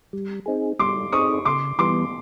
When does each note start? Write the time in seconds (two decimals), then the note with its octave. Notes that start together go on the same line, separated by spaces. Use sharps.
0.13 G3
0.46 C4 D#4 G#4
0.79 G3 C6 D6
1.12 C4 D#4 G#4 C#6 D#6
1.45 C#3 C6 D6
1.78 E3 G3 B3 C6 D6